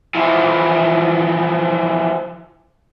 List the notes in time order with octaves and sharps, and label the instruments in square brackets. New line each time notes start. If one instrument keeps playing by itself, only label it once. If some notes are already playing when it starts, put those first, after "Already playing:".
[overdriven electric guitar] E3 F3